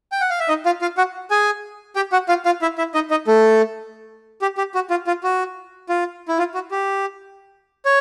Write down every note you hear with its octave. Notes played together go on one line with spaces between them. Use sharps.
G5
F#5
F5
E5
D#4 D#5
F4 F5
F4 F5
F#4 F#5
G#4 G#5
G4 G5
F#4 F#5
F4 F5
F4 F5
E4 E5
E4 E5
D#4 D#5
D#4 D#5
A3 A4
G4
G4
F#4
F4
F4
F#4
F4
E4
F4
F#4
G4
C#5